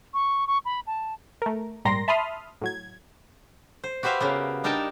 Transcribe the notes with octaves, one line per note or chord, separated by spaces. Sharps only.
C#6
C#6
B5
A5
A3 A#4
A#1 G#2 G3 A#4 C6 A#6
E5 A5 B5 C6 D#6 F6
A2 F#3 G#6
C5
F#4 G4 B4 C5 E5 F5
C#3 A#3 B3
G3 D4 D#4 A#4 G5 A5